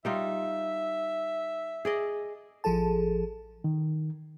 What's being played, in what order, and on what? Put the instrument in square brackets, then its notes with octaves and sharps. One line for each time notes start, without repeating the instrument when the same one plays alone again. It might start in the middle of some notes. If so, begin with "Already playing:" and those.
[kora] G3 D#4 F4 [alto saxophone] E5
[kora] G#4 D5 D#5
[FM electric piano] A1 F3 G#4 A4 A5
[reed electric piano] D#3